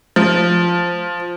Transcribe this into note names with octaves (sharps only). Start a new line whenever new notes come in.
F3